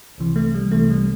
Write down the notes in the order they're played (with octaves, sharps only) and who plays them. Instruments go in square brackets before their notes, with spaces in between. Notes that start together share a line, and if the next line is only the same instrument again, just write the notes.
[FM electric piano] C2 C3 E3
A3
G3
C2 C3 E3 A3
G3